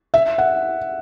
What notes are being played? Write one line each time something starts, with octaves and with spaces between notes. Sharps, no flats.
E5
F#5